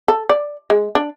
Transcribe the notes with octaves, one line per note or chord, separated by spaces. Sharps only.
A4
D5
G#3
D4